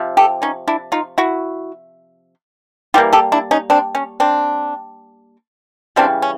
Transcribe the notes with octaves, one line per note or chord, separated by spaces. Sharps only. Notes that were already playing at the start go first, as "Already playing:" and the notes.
Already playing: C3 F3
G4 A4
C#4 D#4
D4 E4
D#4 F4
E4 F#4
E3 G3 A#3 F4 G4
G4 A4
D4 E4
C#4 D#4
C4 D4
C#4
C4 D4
C#3 E3 G3 C4 D4
C#4